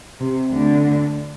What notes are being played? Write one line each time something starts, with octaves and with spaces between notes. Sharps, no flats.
C3
D2 D3